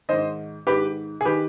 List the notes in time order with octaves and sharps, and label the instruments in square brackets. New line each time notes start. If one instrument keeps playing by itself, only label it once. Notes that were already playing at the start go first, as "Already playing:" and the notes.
[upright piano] G#2 D#3 C5 D#5
G#2 D#3 G4 B4
G#4
D#3 G4 B4